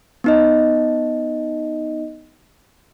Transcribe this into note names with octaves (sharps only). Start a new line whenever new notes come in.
B3 D#4 D#5